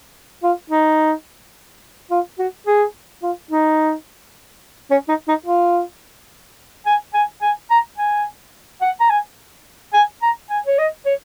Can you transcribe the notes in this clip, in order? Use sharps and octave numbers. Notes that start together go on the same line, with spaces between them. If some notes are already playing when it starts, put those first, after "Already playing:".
F4
D#4
F4
F#4
G#4
F4
D#4
C#4
D#4
D#4
F4
G#5
G#5
G#5
A#5
G#5
F#5
A#5
G#5
G#5
A#5
G#5
C#5
D#5
C#5